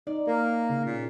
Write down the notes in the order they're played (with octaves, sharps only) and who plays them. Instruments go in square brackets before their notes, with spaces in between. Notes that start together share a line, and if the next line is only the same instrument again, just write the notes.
[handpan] D#4 [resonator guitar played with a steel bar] D5
[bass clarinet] A#3 [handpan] A#4
[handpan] C#3
[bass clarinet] A#2